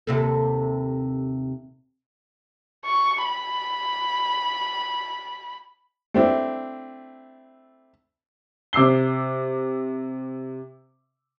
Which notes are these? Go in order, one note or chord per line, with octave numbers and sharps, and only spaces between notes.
D#2 C3 A4
C#6
B5
A3 C4 D4 E4
C3 D6 E6 C7 G7